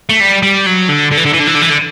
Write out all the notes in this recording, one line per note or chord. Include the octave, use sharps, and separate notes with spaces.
A3
G3
G3
F#3
D3
D3
E3
D3
E3
D3
E3
D3
E3
D3